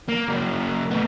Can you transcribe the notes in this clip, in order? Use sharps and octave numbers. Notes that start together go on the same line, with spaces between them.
A#3
C#3 A#3
A2 B3